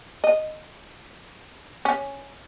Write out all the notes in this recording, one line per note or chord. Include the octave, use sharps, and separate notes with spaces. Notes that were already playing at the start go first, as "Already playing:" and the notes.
D#5
C#4